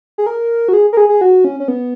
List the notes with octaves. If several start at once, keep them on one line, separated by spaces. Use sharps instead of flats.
G#4
A#4
F#4
G#4
A#4
G#4
G#4
F#4
C#4
C#4
B3